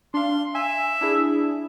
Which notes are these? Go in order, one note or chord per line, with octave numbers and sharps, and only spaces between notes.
D4 F5 C6
E5 G#5
D4 E4 G#4